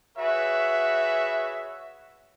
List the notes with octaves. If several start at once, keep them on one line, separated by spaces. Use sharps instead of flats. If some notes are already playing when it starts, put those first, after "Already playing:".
F#4 G#4 B4 C#5 E5